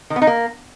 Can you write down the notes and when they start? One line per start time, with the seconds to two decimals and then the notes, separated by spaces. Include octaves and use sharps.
0.10 D#3
0.16 B3
0.22 D#4
0.27 A#3